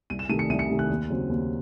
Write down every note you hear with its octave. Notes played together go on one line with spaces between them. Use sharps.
C2 D#7
E7
C3 D#3 A3 D#7
C#7
C2 D#7
C#7
C3 D#3 A3
F#6
D#2
C#3 F#3 C4
D#2